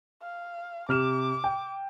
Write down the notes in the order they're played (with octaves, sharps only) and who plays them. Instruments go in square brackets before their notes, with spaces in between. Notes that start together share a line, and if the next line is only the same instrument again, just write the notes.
[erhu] F5
[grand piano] C3 F6 E7 [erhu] D6
[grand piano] G5